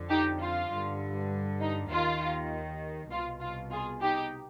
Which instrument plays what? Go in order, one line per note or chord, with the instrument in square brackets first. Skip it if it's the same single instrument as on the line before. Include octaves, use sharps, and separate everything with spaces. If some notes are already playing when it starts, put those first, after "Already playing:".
Already playing: [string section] F2 D3
D#4 G4
F4
G2 D3
D#4
D#2 D#3 F4
C2 B2 F4
F4
F4 G#4
D#4 G4